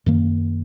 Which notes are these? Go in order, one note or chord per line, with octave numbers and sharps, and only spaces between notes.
F#2 D#3 A#3